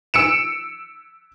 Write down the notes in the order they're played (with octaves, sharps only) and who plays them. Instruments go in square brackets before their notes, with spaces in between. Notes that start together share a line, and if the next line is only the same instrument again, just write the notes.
[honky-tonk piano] E6 C#7 D7 E7